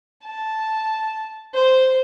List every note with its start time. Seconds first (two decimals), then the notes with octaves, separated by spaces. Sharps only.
0.25 A5
1.54 C5